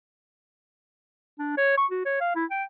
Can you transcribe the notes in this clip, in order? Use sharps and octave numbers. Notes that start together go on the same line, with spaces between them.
D4
C#5
C#6
F#4
C#5
F5
E4
G5